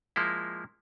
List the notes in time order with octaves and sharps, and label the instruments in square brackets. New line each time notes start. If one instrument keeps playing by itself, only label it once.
[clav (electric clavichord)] F3 G#3 A#3 E4